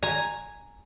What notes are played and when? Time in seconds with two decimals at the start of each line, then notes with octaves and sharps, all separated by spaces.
0.03 G#5 A#5